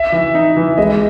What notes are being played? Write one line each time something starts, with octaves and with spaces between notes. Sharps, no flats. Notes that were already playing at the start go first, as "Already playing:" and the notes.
Already playing: E5
E3
D#4
E3
G#3 D#5